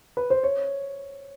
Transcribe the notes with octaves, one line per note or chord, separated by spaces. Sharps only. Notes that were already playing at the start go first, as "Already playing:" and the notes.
B4
C5
C#5